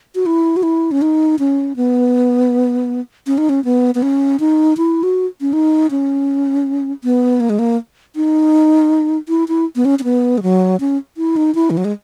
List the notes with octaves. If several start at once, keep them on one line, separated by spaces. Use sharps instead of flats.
F#4
E4
F#4
E4
C#4
D#4
C#4
B3
C#4
D#4
C#4
B3
B3
C#4
D#4
E4
F#4
C#4
D#4
C#4
B3
A#3
G#3
A#3
D#4
E4
E4
B3
C#4
C#4
B3
G#3
F#3
C#4
E4
D#4
E4
E3
F#3
G#3